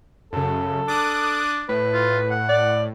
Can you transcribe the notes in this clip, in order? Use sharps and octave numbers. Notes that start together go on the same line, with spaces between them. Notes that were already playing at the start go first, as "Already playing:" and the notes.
F#2 C#3 A4
D4 D6 D#6 F#6
A2 B4
F4
F#5
D5